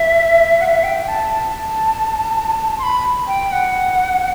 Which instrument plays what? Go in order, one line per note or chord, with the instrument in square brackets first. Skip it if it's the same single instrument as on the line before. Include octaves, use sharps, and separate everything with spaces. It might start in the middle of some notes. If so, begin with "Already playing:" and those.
Already playing: [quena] E5
F#5
E5
G5
A5
A5
C6
B5
G5
F#5